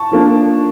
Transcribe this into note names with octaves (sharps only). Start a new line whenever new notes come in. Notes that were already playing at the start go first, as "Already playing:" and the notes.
Already playing: A5 C#6
F3 A#3 D4